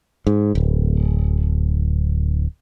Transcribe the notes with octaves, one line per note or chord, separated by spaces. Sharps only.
G#2
D1